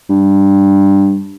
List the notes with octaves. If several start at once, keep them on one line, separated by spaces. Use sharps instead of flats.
G2